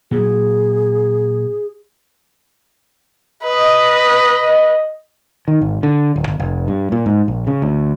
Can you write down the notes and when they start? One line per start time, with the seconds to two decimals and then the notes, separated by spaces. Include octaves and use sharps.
0.11 A#2 F#3 G#4
3.43 B4 D#5
5.48 D#3
5.61 G#1
5.83 D3
6.16 D1
6.28 G1
6.40 F1
6.68 G2
6.92 A#2
7.06 G#2
7.28 A#1
7.47 C#3
7.62 D2